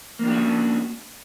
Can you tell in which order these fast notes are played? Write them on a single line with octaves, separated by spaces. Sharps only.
A#3 D4 G4 F#4 C#4